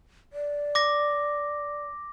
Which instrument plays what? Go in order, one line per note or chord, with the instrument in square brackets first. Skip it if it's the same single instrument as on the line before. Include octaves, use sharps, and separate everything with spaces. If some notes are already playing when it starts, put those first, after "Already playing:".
[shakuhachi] D5
[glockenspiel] D6 A#6